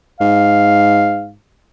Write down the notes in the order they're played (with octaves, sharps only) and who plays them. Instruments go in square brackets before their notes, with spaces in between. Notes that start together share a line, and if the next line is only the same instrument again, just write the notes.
[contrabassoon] G#2 [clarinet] F5